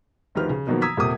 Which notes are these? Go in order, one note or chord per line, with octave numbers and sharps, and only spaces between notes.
D2 D#3 F3 G4 B4 F6
C#3
B2 D#3 F3 F#3 A#3 B3
A#5 D#6 E6 G#6 B6
D#1 C3 A#3 D6 D#6